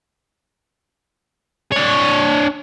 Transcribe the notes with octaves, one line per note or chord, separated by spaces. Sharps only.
D4 C#5